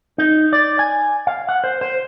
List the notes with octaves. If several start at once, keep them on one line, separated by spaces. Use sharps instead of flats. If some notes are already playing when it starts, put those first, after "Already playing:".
D#4
D5
G#5
F5
F#5
C5
C5